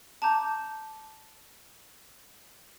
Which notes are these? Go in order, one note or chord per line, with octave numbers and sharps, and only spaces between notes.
A5 A#5 D6 G6